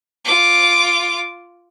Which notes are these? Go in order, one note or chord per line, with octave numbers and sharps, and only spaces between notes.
F4 D6